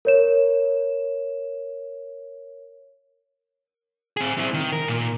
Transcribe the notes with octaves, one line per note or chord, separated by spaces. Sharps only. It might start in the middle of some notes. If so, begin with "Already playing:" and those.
A#4 C#5 E7
C4 G#4
C4 E4
D#3
A#4
A#2